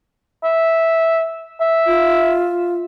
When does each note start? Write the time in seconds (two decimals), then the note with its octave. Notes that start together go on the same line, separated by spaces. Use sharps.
0.44 E5
1.61 E5
1.86 F4